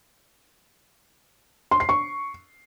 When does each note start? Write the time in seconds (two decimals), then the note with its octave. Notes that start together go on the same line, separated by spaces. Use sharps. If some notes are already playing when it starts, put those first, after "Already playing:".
1.71 C6
1.80 C7
1.89 C#6